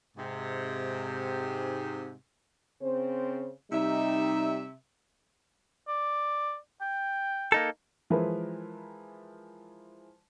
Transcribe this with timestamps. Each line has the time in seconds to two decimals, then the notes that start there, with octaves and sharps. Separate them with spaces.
0.18 G#2 C3
2.82 C#3 C4 C5
3.71 C3 G3 D#4 E5
5.88 D5
6.81 G5
7.52 A#3 D#4 A4
8.10 E3 F3 G#3 E4 A#4 B4